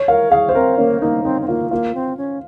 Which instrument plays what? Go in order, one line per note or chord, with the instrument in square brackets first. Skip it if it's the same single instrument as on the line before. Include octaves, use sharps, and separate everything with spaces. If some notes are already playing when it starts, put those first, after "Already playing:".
Already playing: [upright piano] C#5
[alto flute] A#4 [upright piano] F5
[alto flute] G#4 [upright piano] F5
[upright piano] C5
[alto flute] C4 [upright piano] A#4
[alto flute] A#3 [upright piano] C#4
[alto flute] A#3 [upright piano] D#4
[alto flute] C4 [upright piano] D#4
[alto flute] C4
[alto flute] A#3 [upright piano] F4
[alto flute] A#3 [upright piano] F4
[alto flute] C4
C#4